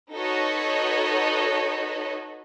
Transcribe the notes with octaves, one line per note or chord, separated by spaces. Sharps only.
D#4 F#4 A4 B4 C#5 D#5